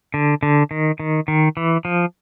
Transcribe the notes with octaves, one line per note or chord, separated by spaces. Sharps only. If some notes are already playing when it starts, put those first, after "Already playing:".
D3
D3
D#3
D#3
D#3
E3
F3